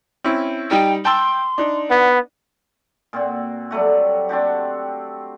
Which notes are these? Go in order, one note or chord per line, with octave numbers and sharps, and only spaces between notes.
C4 C#4 E4
G3 D#4 G5
G5 A5 C6 E6
D4 D#4
B3 F#5
A#2 C4 F#4
F#3 G3 A3 F#4
C4 D4 F#4 G4